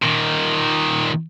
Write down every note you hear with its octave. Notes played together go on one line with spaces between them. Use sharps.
A#2 D#3